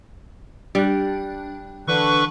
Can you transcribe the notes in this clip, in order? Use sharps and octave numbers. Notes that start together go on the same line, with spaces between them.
G3 D4 F#6
D3 E3 D4 B4 C#6